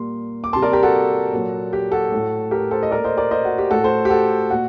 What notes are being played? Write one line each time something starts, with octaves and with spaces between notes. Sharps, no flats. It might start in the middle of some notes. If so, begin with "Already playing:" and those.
Already playing: A#2 G3 A#3 C6
D6
C3 G3 A#3 A5 C6
A#4 D5
G4 A#4
F#4 A4
A#2 F#3 A#3
G4
F#4 A4
A2 A3
G4 A#4
A4 C5
D#5
A#2 A3 A#4 D5
C5 D#5
A#4 D5
C5 D#5
F#4
G4
A2 A3 F#4 A4
A4 C5
G4
F#4 A4
A#2 F#4